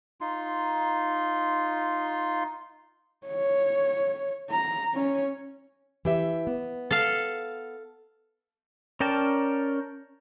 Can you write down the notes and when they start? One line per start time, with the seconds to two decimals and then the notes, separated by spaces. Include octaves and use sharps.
0.21 D#4 F4 C6
3.27 C#5
4.50 A#5
4.94 C#4 C#5
6.05 E3 G4 E5
6.47 B3
6.91 A4 F5
9.00 C#4 A#4 D5 G5 A5